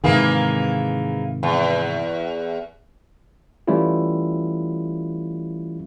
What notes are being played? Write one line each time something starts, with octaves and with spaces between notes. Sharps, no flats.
G#2 C3 D#3 E3 A#3 G#4
E2
E3 G3 A3 C#4 E4 F4